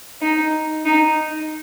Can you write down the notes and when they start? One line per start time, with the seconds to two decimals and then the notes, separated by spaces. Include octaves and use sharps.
0.22 D#4
0.85 D#4